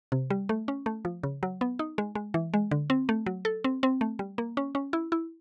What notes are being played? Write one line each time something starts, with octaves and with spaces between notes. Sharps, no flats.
C3
G3
A3
C#4
A3
F3
C#3
F#3
B3
D#4
G#3
G#3
E3
G#3
D3
C4
A3
F#3
A4
C4
C4
A3
G3
A#3
C#4
C#4
E4
E4